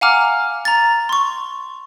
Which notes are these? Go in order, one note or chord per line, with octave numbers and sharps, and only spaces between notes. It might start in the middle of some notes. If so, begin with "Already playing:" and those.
F5 F#5 G#5 A#5 D6 F6
A#5 A6
C6 C#6